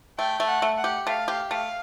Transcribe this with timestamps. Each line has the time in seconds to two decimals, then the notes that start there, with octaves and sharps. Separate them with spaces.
0.19 A3 G5
0.40 A3
0.47 F#5
0.62 A3
0.78 F#5
0.84 G4
1.07 A3 F5
1.28 G4
1.50 A3 F5